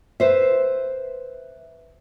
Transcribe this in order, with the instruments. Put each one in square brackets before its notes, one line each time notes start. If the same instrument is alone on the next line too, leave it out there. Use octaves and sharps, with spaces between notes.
[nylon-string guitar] B4 C5 E5